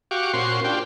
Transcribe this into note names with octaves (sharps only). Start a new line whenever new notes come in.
F#4 G4 F5 C#6 D6
A#2 C#4 F#4 C5 C6
D4 F4 G4 G5